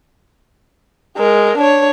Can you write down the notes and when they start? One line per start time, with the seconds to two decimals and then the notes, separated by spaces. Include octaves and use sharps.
1.18 G#3 A#4
1.58 D4 C#5